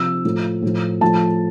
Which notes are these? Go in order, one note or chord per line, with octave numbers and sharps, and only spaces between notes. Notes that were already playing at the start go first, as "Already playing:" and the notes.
Already playing: C3 F3 E6
A2 F3
A2 F3
A2 F3 A5